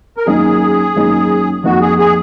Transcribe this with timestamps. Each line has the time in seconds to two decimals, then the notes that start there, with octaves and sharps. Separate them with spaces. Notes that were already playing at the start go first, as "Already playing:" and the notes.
0.17 A#4
0.26 F#2 D#3 A#3 D#4 G#4
0.96 F#2 D#3 A#3 D#4
1.64 F2 D#3 A#3 D#4 F#4
1.81 G#4
1.98 G#4